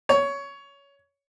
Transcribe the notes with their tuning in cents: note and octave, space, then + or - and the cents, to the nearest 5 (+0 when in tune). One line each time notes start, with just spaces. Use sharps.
C#5 +15